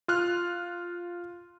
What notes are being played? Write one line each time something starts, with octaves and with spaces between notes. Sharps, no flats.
F4 F6 F#6